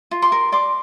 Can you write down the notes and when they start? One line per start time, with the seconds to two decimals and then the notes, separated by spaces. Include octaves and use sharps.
0.11 F4
0.22 C6 D6
0.32 A#4
0.52 D5 C6 D6